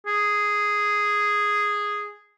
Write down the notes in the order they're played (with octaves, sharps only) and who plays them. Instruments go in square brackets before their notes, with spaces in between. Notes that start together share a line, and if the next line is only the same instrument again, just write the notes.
[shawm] G#4